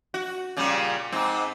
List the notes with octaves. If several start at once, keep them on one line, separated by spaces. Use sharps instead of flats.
F#4
A#2 C#3 G3
G#2 C4